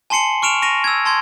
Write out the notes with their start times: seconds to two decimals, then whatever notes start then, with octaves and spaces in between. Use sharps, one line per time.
0.10 G#5 A5 C6 C7 C#7 F#7
0.42 C#6 F6 D7 E7 F7
0.62 C#6 A#6 D#7 F7
0.84 E6 G#6
1.05 A5 C6 G#6